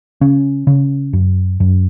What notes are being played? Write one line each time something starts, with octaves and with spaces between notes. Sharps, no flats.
C#3 C#4
C#3
F#2
F#2